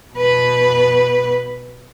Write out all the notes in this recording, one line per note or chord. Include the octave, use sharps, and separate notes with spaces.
B2 B4